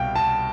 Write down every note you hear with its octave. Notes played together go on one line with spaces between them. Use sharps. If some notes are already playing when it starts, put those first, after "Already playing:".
Already playing: C2 B2 F5 G5
A5